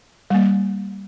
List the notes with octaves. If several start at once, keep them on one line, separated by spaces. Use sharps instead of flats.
G3 A#3